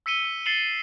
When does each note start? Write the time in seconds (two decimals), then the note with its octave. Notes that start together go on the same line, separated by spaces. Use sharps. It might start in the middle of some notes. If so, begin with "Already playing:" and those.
0.06 E6 B6 C#7 D#7 G7
0.46 A6 C7 C#7 E7 F#7 G7